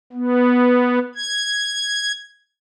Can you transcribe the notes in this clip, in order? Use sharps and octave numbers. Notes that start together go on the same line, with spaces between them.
B3
G#6